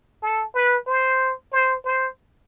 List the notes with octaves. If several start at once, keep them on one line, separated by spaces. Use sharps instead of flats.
A4
B4
C5
C5
C5